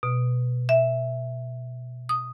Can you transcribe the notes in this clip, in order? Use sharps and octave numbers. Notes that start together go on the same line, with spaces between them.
B2
E5
D#6